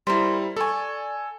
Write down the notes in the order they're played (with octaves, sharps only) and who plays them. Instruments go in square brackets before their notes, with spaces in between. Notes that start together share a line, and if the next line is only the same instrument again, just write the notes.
[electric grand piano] G3 E4 [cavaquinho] A#4 C5
[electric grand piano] A4 G#5 [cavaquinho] D5 C#6